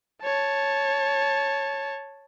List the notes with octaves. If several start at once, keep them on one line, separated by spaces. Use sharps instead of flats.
C#5 A5